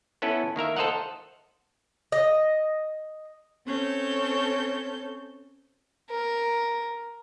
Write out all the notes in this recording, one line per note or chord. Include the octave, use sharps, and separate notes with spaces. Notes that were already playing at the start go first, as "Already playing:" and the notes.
B3 C#4 E4 A4 B4
D#3 A#3 A#4 E5
A4 C5 D#5 F5 F#5
D#5
C4 C#4 A4 G6
A#4